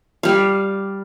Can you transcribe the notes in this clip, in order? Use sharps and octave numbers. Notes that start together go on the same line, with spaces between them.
G3 F5